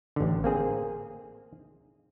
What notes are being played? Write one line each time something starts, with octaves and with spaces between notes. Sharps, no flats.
A1 D3
A#3 C4 G#4